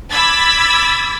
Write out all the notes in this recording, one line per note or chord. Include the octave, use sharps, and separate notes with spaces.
B5 D6 E6 G#6 A6 B6